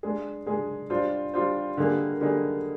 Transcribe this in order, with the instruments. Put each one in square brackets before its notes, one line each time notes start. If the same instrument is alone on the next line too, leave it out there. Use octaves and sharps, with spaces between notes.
[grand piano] G#3 D4 G#4
G#3 D4 G#4
G3 D4 F4 C5
G3 D4 F4 C5
D3 G3 A#3 D#4 G#4
D3 G3 A#3 D#4 G#4